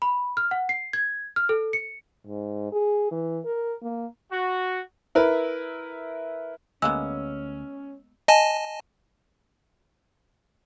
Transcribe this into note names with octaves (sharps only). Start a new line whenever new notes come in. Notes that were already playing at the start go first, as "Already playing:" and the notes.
B5
F6
F#5
C7
G#6
F6
A4
C#7
G#2
G#4
E3
A#4
A#3
F#4
E4 A#4 B4
D2 G#3 A#3 B3 C#4 E6
D#5 G#5 A5